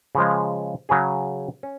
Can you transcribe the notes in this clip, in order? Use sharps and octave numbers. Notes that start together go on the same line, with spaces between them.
C#3 F3 G#3
C#3 F#3 C#4 G#4
C#4